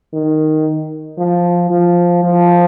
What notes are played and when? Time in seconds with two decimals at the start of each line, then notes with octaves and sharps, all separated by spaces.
0.13 D#3
1.18 F3
1.70 F3
2.23 F3